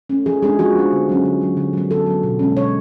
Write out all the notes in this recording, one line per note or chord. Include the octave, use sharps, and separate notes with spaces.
A3 C#4
F3 G#4
G#3 B3 D4 G#4
F3 F#4
G#3 B3 D4
D3
F#3 C#4
D3
F#3 C#4
D3
F#3 B3
D3 A4
F#3 B3
B2
G#3 C#4
B2 C#5